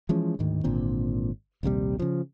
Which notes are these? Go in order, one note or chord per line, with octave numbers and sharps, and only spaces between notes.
E3 F3 G#3 C#4
D2 G#2 D#3
G#1 A#2 D3 C4
A#1 D#2 C3 G3
C#3 F3